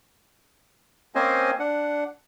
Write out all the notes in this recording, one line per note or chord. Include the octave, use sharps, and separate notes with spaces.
A#3 C4 C#4 C5 D#5 G#5
D4 F#5